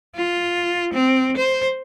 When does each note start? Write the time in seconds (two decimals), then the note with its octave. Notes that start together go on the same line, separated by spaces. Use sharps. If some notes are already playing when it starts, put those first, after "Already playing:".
0.16 F4
0.93 C4
1.36 C5